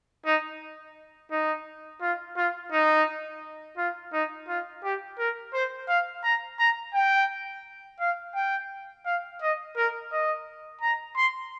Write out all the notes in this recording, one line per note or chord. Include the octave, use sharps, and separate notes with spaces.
D#4
D#4
F4
F4
D#4
F4
D#4
F4
G4
A#4
C5
F5
A#5
A#5
G5
F5
G5
F5
D#5
A#4
D#5
A#5
C6